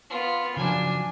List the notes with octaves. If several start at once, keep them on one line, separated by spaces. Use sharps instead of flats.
B3 F4
C#3 F3 F#3 D4 G#5